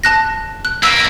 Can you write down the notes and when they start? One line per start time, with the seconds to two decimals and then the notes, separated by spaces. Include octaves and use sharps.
0.04 A5 F#6 A#6
0.65 F#6
0.83 B1 A#3 E6 B6